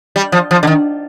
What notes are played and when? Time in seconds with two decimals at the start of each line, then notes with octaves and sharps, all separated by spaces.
0.16 G3
0.32 F3
0.51 F3
0.63 D3
0.67 D#3